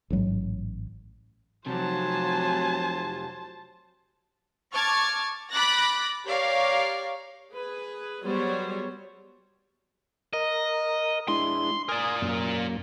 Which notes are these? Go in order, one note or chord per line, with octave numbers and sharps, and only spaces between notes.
A1 G#2 F#3 G#3
F2 C3 F#3 C5 G#5 A5
A5 C#6 D6 F6 G#6 A6
B5 D6 F#6 A6 A#6
G4 A#4 C#5 D5 F5
G#4 B4
F#3 G3 B3 G#4 C5 C#5
A#4 D#5
G#3 D4 E4 C6
A#4 D5 G#5 D#6
F#2 A#3